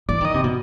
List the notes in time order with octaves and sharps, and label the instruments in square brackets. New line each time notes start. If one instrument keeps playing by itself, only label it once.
[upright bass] E3 [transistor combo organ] D5
[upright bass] D#3 [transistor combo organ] D#5
[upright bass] C3
B2